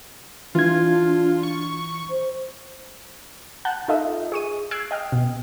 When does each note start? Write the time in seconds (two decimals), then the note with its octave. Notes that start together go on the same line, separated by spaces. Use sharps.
0.55 E3 D4 F4 G#6
1.43 C#6
2.10 C5
3.65 F#5 A5 F#6 G6
3.88 D#4 F4 A4 D#5 E5
4.32 G#4 C#6 D#7
4.71 E6 F#6 G#6 C7 D7
4.91 D#5 G5 F6
5.12 B2